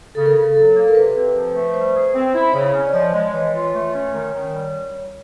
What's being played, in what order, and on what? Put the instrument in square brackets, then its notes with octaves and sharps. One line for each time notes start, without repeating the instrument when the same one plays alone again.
[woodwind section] C#3 [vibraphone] A4
[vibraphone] A#4
[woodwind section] C#3 [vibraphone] A4
[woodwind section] F#3 [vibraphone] A4
[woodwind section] A#3
[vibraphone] A#4
[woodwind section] C3 [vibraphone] B4
[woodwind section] C4
F3
A3
[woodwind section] G3 [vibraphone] C5
[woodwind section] G#4
C4
E4
[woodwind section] C#3 [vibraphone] C#5
[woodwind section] C#4
[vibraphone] D5
[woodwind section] F3 [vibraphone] D#5
[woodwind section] G#3
[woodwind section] E3 [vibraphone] C#5
[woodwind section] F4
A3
C#4
D#3
D#3
G3